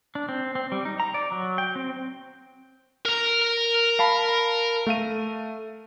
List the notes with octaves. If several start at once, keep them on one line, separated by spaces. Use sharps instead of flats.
D4
C4
C4
G3
D#4
A#5
D5
F#3
G5
C4
A#4 A#5
F5 A5 B5
A3 F5 D#7